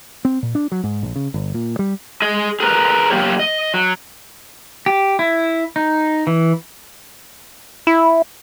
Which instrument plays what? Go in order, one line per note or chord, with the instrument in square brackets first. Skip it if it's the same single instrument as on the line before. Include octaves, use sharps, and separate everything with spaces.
[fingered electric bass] C4
A#2
D4
F#3
G#2
A#1
C#3
G1
A#2
G3
[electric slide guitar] G#4 D#5
G#4 A#4 B4 A#5
F#3 A#3 G4 C#5
D#5
F#3
[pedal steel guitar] G4
E4
D#4
E3
[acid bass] E4